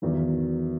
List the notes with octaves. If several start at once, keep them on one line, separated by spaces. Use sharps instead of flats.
E2 D#3 F#3